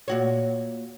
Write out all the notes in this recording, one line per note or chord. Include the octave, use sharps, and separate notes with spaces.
A#2 F#4 C#5